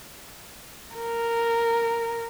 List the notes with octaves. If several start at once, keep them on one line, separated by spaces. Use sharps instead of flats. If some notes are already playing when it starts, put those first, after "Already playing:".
A#4